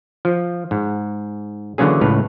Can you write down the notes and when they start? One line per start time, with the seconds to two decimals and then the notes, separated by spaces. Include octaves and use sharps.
0.25 F3
0.71 G#2
1.78 D3 E3 F#3 A#3 C#4 G#4
2.01 C#2 A2 B4 F5